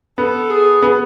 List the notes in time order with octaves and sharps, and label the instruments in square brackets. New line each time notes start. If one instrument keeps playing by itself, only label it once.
[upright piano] B3 [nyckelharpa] A4
[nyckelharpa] G#4
[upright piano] B3